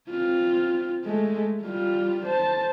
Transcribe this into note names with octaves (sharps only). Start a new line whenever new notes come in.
C4 F4
G#3 A3
G3 F4
C5 A5